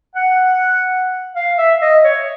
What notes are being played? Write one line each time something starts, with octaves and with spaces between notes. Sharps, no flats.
F#5
F5
E5
D#5
C#5